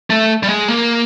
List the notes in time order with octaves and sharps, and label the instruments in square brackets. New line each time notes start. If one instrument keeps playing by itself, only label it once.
[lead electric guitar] A3
G3
G#3
A#3